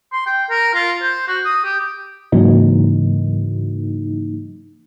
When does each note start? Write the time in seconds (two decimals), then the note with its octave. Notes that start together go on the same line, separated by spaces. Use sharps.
0.13 C6
0.26 G5
0.50 A#4
0.74 F4
1.03 C5
1.28 F#4
1.45 D#6
1.65 G4
2.32 G#2 C#3 E3 F#3 A#3 D#4